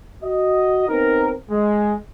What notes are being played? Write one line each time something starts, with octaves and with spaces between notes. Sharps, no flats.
F#4 D#5
B3 C4 D#4 A#4
G#3